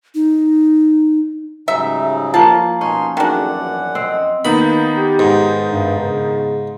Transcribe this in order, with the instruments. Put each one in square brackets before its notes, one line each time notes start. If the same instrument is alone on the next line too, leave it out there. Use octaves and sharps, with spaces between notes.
[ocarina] D#4
[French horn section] G#2 G3 [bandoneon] C#3 F#3 D#4 [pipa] E5
[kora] F3 A#3 [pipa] A5
[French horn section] B2 A#3 [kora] C#4 [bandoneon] D#4 C6
[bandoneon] F#2 F#5 [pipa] D#3 D4 [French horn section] A3 F#4 G#4
[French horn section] E2 D5
[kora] C4 [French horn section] D#5
[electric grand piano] D#3 B3 D#4 [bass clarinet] A#3 [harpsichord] B5
[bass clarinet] G4
[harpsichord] G#2
[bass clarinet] G2
C#3